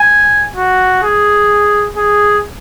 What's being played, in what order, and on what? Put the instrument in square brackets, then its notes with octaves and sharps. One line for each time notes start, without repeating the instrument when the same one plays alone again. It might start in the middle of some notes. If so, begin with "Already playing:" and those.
Already playing: [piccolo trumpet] G#5
F#4
G#4
G#4